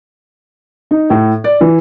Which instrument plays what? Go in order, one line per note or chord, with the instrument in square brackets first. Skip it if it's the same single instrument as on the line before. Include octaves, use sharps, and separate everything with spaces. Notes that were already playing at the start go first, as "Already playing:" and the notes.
[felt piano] D#4
A2
D5
E3